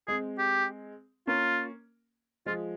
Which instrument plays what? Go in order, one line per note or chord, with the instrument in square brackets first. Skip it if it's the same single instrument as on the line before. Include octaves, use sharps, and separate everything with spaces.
[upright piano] G#3 C4 [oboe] G#4
[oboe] G4
[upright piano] A#3 C#4 [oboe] F4
[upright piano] F3 G#3 [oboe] F4